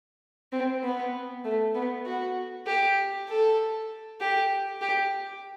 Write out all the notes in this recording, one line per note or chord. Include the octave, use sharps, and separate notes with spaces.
C4
B3
A3
B3
F#4
G4
A4
G4
G4